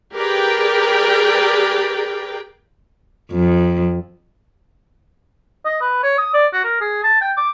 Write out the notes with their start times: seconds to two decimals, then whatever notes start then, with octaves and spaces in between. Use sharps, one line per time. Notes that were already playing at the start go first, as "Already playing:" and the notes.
0.12 G4 G#4 A#4 B4 D5 G5
3.31 F2
5.65 D#5
5.81 B4
6.03 C#5
6.18 D#6
6.34 D5
6.53 F#4
6.64 A#4
6.81 G#4
7.03 A5
7.21 G5
7.37 D6